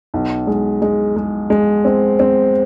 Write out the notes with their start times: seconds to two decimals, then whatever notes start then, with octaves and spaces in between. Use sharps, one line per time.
0.14 B1
0.47 G#3
0.82 G#3
1.16 G#3
1.50 G#3
1.85 C4
2.19 C4